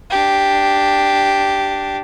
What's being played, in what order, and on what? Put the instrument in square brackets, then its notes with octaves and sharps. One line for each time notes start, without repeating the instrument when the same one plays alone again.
[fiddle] D4 G4